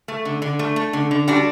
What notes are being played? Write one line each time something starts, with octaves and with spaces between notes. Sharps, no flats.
A3
D3
D3
A3
A3
D3
D3
G3 D4 F#4